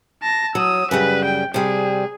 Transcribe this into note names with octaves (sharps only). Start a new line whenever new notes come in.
A5 A#6
F#3 D#6 E6
F#2 C#3 G3 B4
G5
C3 G3 G#4